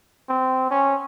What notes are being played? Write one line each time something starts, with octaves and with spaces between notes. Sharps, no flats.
C4
C#4